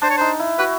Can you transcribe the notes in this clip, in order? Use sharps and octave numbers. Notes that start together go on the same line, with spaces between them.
D4 C5
C#5
D#4 C5
E4
F#4 B4